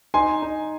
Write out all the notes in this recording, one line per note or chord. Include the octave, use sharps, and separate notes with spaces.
D#4 G#5 C6
D#4